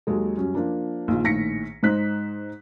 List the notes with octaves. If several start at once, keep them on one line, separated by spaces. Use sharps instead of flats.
D#2 F#3 G#3 A4
F#2 G3 C#4
F3 A#3 D4
A#1 D#3 F4
A#1 A2 D#3 A#6 B6 C#7
G#2 D#4 C5 F#6 B6